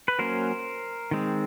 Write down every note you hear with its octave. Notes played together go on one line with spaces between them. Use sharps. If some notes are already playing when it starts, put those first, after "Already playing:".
B4
F#3 A#3 C#4 A#4 C5
D#3 G#3 C4